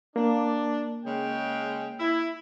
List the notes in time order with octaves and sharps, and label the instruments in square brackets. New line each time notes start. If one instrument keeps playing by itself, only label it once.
[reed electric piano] A#3 [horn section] D4
[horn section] C#3 G#3 G5
E4